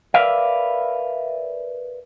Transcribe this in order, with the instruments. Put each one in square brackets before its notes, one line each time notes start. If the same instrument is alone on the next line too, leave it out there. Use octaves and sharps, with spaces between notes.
[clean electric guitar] A#4 B4 D5 E5 F5